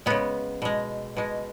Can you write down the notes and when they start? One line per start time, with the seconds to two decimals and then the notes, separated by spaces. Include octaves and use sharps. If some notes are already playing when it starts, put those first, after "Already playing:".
0.06 C#3 G#3 B3
0.62 B2 G#3
1.17 B2 G#3